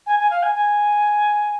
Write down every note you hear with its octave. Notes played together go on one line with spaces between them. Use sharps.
G#5
G#5
F5
G#5
G#5